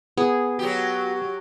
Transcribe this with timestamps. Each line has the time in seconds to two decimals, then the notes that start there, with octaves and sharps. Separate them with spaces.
0.18 B3 G#4
0.59 F#3 F#4 G4